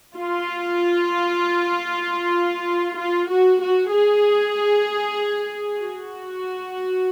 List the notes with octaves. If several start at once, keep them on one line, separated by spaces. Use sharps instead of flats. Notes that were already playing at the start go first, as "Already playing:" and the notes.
F4
F4
F#4
F#4
G#4
F#4